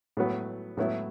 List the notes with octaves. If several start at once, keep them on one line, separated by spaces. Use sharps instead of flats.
A2 F#3 B3
A2 F#3 B3 E4